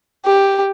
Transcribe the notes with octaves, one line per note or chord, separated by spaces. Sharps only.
G4